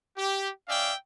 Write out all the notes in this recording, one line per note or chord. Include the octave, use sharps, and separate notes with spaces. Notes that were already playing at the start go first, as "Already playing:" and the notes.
G4
C#4 D5 E5 F5 G5